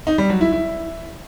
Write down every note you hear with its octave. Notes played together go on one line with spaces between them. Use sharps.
D#4
G3
F#3
E4
E4